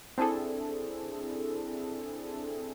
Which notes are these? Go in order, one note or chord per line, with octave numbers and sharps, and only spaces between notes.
C4 D4 E4 G#4 A4